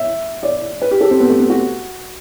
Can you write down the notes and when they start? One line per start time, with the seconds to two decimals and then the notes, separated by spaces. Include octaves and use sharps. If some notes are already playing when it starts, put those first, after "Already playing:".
Already playing: E5
0.43 D5
0.82 B4
0.91 G4
1.01 A4
1.11 C4
1.20 B3
1.30 A3
1.40 B3
1.50 F#4